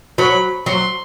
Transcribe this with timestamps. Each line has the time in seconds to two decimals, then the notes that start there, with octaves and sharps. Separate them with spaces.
0.18 F#3 B5
0.66 F#3 C6